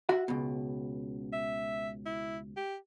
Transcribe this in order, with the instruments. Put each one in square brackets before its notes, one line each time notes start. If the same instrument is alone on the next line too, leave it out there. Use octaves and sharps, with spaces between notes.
[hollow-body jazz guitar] F#4 E5 F#5
C#2 B2
[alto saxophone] E5
E4
G4